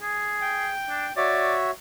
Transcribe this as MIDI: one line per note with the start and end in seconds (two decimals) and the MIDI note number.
0.02 0.70 68
0.41 1.13 79
0.90 1.06 62
1.17 1.71 66
1.17 1.71 73
1.17 1.54 74
1.17 1.71 76